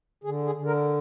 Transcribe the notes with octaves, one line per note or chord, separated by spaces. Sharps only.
D3 G#4
G#4
D3
A#4